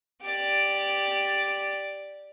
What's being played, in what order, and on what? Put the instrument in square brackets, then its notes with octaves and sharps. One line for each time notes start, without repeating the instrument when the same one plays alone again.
[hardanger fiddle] G4 D5